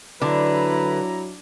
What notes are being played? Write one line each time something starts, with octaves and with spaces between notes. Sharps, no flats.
D3 F#3 E4 B4 A#5